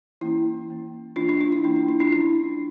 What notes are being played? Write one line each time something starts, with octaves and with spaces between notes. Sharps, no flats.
E3 A#3 C#4 E4
E3 A#3 C#4
E3 A#3 C#4 D4 F4
D4 F4
D4 F4
E4
E3 A#3 C#4 D4
E4
E4
D4 F4
F3 C#4 E4